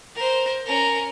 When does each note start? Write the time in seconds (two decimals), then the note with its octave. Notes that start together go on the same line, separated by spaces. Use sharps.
0.15 A#4 C5
0.66 C#4 A#4